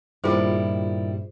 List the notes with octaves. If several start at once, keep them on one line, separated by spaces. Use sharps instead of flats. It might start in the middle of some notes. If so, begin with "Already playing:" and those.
G2 A#2 D#3 G3 E4 F4 G#4 C5